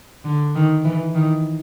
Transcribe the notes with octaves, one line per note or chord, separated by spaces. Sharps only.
D3
D#3
E3
D#3